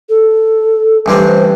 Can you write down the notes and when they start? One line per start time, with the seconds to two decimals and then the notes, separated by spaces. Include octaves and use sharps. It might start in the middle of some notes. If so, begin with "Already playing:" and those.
0.09 A4
1.06 A1 G2 D3 G3 C4
1.26 C5